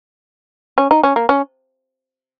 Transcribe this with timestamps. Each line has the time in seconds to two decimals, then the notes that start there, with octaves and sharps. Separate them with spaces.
0.78 C#4
0.91 D#4
1.03 C#4
1.16 A#3
1.29 C#4